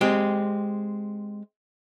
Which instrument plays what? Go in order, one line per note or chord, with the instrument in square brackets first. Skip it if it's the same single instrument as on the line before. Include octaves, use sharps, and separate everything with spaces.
[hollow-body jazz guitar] G#3 C4 G4